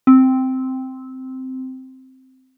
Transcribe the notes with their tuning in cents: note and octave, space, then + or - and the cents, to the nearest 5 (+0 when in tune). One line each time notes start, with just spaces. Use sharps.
C4 -5